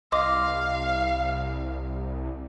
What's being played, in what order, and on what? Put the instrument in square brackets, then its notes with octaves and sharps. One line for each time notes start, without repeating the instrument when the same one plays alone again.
[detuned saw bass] C2 [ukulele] D#5 [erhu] F5 [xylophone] C6 D6